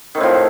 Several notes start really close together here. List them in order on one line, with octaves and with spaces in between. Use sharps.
D#3 C4 A2 F3